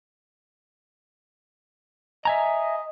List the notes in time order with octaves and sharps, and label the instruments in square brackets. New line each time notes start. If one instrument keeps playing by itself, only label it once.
[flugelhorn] D#5 [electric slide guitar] E5 G#5 A#5